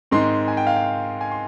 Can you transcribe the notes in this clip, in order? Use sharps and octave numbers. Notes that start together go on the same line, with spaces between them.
G#2 D#3 G#3 C4 C6
G#5
G5
F5
G5
G#5
C6